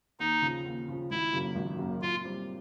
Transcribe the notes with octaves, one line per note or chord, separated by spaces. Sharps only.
D#2 D#4
C#3 F3
D#2
C#3 F3
G#1 E4
F#2 C#3 F#3 A#3
G#1
F#2 C#3 F#3 A#3
A#2 F4
G3 C4